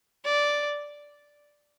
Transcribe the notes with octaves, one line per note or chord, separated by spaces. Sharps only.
D5